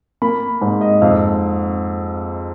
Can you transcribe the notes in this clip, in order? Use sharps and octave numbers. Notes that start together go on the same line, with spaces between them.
A#3 B5
G#2
D#5
F2 F5